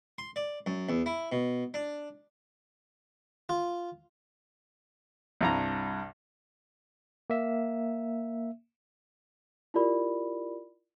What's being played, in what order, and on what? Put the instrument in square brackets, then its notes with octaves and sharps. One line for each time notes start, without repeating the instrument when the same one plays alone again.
[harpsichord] C6
D5
F#2
E2
E4
B2
D4
F4
[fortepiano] C2 G2 A#5
[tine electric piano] A#3 E5
[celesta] E4 F4 G4 A#4 D5 B5